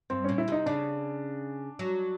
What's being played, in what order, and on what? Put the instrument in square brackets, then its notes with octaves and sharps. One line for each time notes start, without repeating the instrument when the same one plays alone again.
[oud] G2 [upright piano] C4
[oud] A#2 [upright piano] C#4
[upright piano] E4
[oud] C3 [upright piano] D#4
[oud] C#3 [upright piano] D4
[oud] F#3